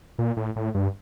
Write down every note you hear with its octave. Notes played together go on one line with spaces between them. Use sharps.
A#2
A2
A2
G2